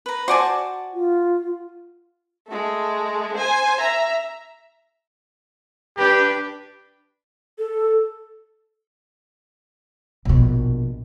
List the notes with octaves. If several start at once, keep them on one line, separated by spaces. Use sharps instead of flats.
B4 A#5
F#4 C5 D5 G#5 A5
F4
G#3 A3
C5 G#5
E5 A#5
D4 G4 B4
A4
A#1 B2